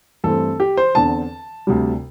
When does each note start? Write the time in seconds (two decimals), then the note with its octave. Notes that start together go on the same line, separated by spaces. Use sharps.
0.24 G2 E3 A3 C4 A4
0.60 G4
0.77 C5
0.95 E2 D3 C4 A5
1.67 D2 C3 G3